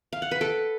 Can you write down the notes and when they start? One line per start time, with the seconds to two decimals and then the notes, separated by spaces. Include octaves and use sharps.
0.13 F5
0.22 F#5
0.31 B4
0.41 A4